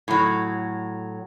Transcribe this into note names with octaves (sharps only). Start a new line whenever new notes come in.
A2 F#3